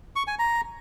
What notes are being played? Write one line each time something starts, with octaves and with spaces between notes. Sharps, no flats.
C#6
G#5
A#5